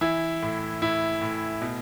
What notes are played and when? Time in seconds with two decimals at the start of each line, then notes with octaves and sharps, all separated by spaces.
0.01 E3 E4
0.42 A2
0.82 A2 E4
1.21 A2
1.62 B2